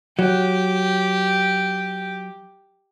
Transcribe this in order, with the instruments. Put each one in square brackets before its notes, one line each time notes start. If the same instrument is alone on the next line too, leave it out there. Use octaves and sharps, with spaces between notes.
[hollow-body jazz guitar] F#3 [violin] G4